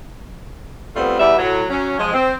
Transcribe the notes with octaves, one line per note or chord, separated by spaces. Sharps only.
G3 A3 B3 C4 F4
E2 G3 B3 E5
A2 F#3
F#3 C#4
F3 G#3
C4